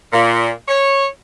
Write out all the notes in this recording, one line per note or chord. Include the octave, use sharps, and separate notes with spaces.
A#2
C#5